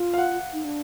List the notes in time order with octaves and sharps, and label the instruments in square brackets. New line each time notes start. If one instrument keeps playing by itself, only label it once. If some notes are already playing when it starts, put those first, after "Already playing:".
Already playing: [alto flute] F4
[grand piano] F5
F#5
[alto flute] D#4
D4